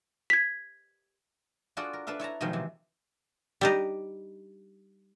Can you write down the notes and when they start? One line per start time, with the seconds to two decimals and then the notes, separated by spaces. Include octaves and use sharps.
0.30 G#6 B6
1.77 D4 F4 F#4 G#4 A4 D5
1.93 A#4
2.07 D4 A4 B4 E5 F5
2.19 E4 C#5 A5 A#5
2.41 B2 D#3 F3 F#3 G#3
2.53 C3 E3
3.61 G3 D4 D#4